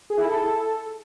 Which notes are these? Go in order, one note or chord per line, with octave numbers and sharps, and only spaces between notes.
G#4
E4
A4